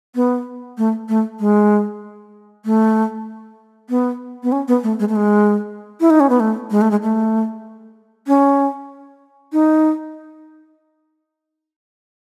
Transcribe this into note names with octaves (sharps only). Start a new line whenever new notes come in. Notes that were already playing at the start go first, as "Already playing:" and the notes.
B3
A3
A3
G#3
A3
B3
B3
C#4
B3
A3
G#3
A3
G#3
E4
D#4
C#4
B3
A3
G#3
A3
G#3
A3
C#4
D#4